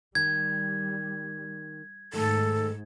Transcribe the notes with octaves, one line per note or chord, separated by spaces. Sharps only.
D#3 G3 G#6
G#2 D#3 A3 A4